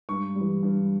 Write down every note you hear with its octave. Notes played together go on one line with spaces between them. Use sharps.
G2 C#6
E3 G3
G2